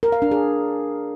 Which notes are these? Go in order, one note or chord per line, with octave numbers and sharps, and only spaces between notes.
A#4
F5
D4
G#4